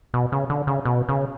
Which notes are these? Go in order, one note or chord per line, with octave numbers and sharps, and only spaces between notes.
B2
C#3
D3
C#3
B2
C#3